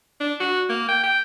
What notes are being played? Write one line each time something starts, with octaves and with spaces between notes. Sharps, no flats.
D4
F#4
A#3
G5
G5